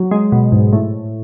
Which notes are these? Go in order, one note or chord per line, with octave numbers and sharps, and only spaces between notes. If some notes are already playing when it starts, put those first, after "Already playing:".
Already playing: F#3
G#3
B2
G#2
A2